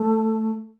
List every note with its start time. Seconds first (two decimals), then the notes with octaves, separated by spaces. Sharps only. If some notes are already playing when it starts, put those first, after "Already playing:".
Already playing: A3